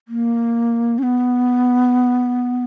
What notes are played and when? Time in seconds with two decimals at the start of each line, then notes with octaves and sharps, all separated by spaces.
0.08 A#3
0.98 C#4
1.03 B3